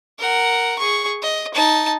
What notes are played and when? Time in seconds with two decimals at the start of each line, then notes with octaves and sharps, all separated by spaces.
0.19 A#4 F#5
0.79 G#4 C#6
1.22 D#5
1.55 D#4 A5